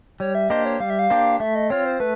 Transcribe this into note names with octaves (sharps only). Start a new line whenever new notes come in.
G3 C#5
E5
A#3 D4 G4 C5 D#5
C#5
G3 F5
E5
F5
A#3 D4 G4 C5
A3 E5
D#5
C4 F4 C#5
C5
A3 B4